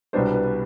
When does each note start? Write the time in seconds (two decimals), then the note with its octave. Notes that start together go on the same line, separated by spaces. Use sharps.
0.13 C2 B2 G3 B3 D4 C5
0.34 B4